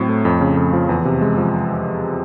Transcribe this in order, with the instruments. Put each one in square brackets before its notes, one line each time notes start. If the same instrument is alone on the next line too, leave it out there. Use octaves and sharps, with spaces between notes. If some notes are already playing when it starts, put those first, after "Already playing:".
Already playing: [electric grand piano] A2 F#3 C4
A3
F2
C#3
F2
F3
E2
C3
G#3
F3